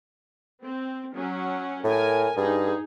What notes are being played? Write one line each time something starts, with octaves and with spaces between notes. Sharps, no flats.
C4
F#3 C#4 F#5
A2 A#4 G#5
G2 D#4 G#4